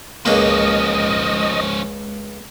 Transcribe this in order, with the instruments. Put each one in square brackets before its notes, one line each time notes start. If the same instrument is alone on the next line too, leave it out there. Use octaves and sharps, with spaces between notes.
[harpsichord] C#2 A#3 [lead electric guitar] F3 C#4 [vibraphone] G#3 [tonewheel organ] D#5